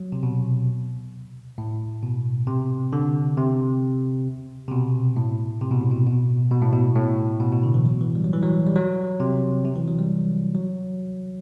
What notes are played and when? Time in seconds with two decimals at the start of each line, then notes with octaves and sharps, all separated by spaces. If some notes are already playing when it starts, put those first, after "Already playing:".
Already playing: F#3
0.12 C3
0.23 B2
1.58 A2
2.03 B2
2.47 C3
2.93 D3
3.37 C3
4.68 C3
4.71 B2
5.16 A2
5.62 C3
5.71 B2
5.81 A2
5.91 B2
6.06 B2
6.51 B2
6.62 A2
6.73 B2
6.96 A2
7.40 B2
7.52 B2
7.63 D3
7.74 E3
7.85 F#3
8.01 E3
8.15 G3
8.24 F#3
8.33 E3
8.43 F#3
8.67 G3
8.75 F#3
9.20 C3
9.65 C3
9.76 E3
9.88 F#3
9.99 G3
10.55 F#3